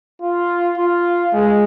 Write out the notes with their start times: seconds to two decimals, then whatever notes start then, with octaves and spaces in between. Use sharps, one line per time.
0.21 F4
0.77 F4
1.33 G#3